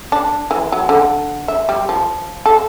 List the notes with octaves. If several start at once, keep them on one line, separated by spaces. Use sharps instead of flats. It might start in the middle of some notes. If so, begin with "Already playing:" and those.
D4
E3
F#3
D3
E5
G3
F3
A4